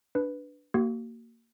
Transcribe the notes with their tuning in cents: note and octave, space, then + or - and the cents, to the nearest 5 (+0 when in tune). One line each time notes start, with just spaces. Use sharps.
D4 +0 B4 +0
A#3 -15 F#4 +35